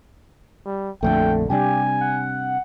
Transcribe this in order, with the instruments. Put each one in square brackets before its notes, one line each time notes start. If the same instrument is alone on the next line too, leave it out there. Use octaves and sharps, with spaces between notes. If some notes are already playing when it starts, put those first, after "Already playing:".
[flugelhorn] G3
[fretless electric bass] A#1 F2 D3 [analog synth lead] A3 [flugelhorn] G5
[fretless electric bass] C3 G3 D4 [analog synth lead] G4 [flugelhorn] G#5
[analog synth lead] F#5